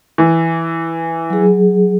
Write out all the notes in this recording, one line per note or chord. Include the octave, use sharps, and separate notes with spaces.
E3
F#3 G#4